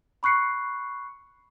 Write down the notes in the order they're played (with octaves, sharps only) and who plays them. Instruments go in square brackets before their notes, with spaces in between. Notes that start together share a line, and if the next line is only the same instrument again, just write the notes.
[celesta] B5 C#6 F#6 C7 C#7